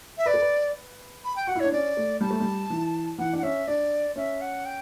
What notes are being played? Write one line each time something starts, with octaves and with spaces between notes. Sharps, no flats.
E5
B4 D5
A4
B4
B5
G5
F#4 F#5
E4
D4 C#5
C#4 D5
A3
G3 A5
A3
G3
E3
E3 F#5
D4
F#5
C#4 E5
D4 D5
C#4 E5
F#5
G5